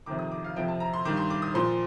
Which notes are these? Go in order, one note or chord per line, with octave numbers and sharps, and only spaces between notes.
F2 C3 D#3 D6
D#6
D6
F5
F2 C3 F3 G5
A5
A#5
C6
G2 D#3 D6
C6
D6
D#6
A#2 F3 C6